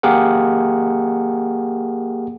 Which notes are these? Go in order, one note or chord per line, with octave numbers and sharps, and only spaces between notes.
A#3 G4 G#4 A#4 F#5